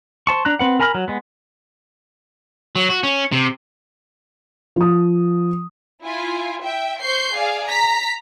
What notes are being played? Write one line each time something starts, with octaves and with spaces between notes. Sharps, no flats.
C5 A5 C#6
D4 A#5 F#6
C4 B4 F#5
A#4 G#5 A#5 B5 F6
F#3
G#3 B3
F#3
F#4
C#4
C3
F3 D#6
E4 F4 G#5
E5 G5
C5 C#6 G6 C7
G#4 D5 F5
A#5 B6